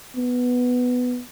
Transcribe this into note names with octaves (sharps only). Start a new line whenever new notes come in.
B3